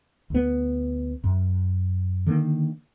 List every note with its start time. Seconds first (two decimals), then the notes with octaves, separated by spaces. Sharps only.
0.30 D2 B3
1.24 F#2
2.26 D3 D#3 A#3